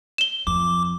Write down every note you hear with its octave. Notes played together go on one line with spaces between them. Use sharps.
E7 G7
F2 D6